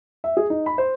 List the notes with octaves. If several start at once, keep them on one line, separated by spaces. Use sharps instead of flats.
E5
G#4
D#4
B5
C5